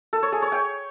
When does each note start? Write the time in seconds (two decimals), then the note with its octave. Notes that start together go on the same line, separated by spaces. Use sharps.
0.13 A4
0.23 C#5
0.32 G#4
0.42 C#5
0.52 G5